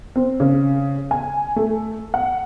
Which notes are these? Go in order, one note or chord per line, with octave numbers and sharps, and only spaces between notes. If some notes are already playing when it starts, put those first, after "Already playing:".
C4
C#3
G#5
A3
F#5